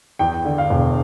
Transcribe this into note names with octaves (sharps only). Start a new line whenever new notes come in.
E2 G5
D3
F5
E1